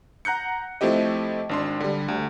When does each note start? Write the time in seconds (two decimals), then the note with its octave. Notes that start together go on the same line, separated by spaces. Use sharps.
0.25 F#5 A#5 F#6 G6 C#7
0.81 F3 A3 C4 E4 G4 D#5
1.49 G#1 D4 C6
1.80 D3 G3
2.08 D2